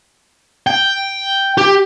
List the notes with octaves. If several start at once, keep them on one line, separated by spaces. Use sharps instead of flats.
G5
G4